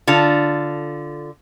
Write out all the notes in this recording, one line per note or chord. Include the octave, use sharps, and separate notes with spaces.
D3 F4 A4